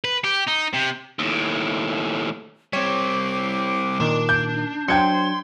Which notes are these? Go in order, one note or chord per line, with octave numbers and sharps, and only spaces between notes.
B4
G4
D#4
C3
D#2 A2
G3 C4 C#5 D6
A#2 D#3 D4
G6
F#3 D4 C5 G5 C6 G#6 C#7